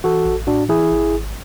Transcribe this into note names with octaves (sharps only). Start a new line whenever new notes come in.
E3 F#4 A4
A1
A2 D4 F#4
E3 E4 G#4
G#1
G#1